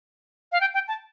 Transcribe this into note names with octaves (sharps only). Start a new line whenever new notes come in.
F5
G5
G5
A5